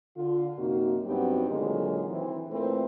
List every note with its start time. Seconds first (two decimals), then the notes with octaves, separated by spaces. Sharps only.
0.17 D3 F4
0.58 F#2 C3 A#3 D#4 F#4
1.06 G2 F#3 B3 C4 D#4 G4
1.50 A#2 D3 D#3 F#3 G#3
2.09 E3 C4
2.51 A#2 A3 C4 E4 A#4 B4